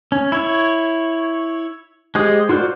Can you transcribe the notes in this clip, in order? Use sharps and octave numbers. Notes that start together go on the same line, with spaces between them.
C#4
E4 C#5
G#3 G4 C5 D#6
F4 F#4 A#4 C5 D5